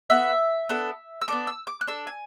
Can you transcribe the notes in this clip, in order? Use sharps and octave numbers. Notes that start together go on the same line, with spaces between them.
B3 F#4 A4 E5
B3 D4 A4
E6
B3 D4 A4 D6
E6
D6
F#6
D4 A4 E6
G#5